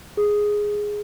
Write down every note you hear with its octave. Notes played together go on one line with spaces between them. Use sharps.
G#4